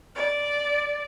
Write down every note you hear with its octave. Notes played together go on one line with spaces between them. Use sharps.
D5